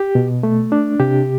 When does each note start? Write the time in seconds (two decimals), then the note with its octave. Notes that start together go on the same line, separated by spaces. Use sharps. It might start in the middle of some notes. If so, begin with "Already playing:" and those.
Already playing: G4
0.15 B2
0.43 A3
0.72 D4
1.00 C3 G4